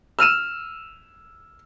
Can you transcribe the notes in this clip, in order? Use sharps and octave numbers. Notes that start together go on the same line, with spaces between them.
E6 F6 D#7 E7